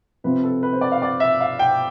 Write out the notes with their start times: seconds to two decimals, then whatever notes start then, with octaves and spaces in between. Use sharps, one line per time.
0.24 C3 F3 C4 B4
0.44 A4
0.63 B4
0.73 C5
0.81 D5
0.92 F5
1.02 D5
1.20 E5
1.41 F5
1.59 G5